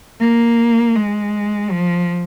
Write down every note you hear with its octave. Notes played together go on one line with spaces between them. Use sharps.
A#3
G#3
F3